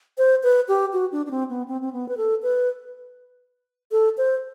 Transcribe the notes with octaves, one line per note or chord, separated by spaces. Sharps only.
C5
B4
G4
F#4
D4
D4
C4
B3
C4
C4
B3
B4
A4
B4
A4
C5